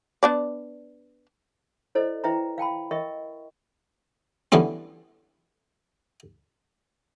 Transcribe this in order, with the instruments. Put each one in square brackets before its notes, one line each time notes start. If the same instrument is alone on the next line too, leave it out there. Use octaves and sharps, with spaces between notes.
[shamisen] B3 D4 D5
[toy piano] E4 A4 C5 D5 D#5
E4 B4 E5 G5 A#5
F5 G5 A5 B5
A#4 D#5 E5 G5 C#6
[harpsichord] D3 E3 G3 B3 C#4